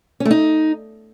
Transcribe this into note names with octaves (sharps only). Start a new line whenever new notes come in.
C#4
A3
D#4